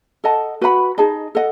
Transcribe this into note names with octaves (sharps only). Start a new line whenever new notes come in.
A4 D#5 F#5 A5
F#4 B4 F#5 B5
D#4 G#4 D#5 A5
A4 D#5 F#5